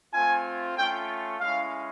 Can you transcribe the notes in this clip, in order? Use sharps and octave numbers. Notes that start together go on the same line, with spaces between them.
A3 C4 F4 G#5
A3 C#4 F4 G5
G#3 C#4 E4 F5